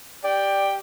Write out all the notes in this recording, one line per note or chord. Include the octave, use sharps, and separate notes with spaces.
G4 D5 G5